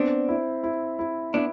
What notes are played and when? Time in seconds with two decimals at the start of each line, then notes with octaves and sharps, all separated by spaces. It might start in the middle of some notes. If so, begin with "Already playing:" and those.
Already playing: B3 C4 D4
0.29 E4
0.63 E4
0.99 E4
1.34 B3 D4 E4